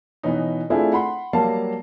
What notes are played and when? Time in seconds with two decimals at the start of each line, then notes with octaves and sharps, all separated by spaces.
0.23 B2 E3 B3 C#4 D#4
0.70 A3 C4 D4 E4 F4 G#4
0.93 F#5 B5 C6
1.33 F#3 G3 A#3 F5 A5 C7